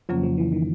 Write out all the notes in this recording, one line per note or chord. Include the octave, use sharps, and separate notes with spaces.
F2 C#3 F3 F#3 A#3 C#4
F3
E3
D#3